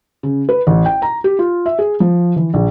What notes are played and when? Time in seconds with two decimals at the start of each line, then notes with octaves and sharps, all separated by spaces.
0.23 C#3
0.49 B4
0.67 A1
0.86 G5
1.02 A#5
1.24 G4
1.39 F4
1.66 E5
1.79 G#4
2.00 F3
2.36 E3
2.54 A#1